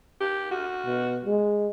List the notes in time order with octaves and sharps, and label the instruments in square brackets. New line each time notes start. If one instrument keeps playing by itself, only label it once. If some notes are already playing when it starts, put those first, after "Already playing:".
[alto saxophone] G4
F#4
[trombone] B2
G#3